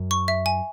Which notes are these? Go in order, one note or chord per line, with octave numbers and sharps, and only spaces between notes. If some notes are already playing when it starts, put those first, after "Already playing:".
Already playing: F#2
C#6
E5
G#5